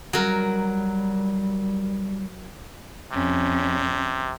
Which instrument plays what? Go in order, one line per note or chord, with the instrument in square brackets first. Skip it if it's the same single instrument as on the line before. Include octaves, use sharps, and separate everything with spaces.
[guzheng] F#3 A#4 [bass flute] G3
[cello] F2 C#4 [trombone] C3